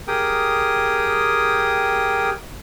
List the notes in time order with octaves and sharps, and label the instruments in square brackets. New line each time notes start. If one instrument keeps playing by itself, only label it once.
[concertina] G4 G#4 A#4 G5 D#6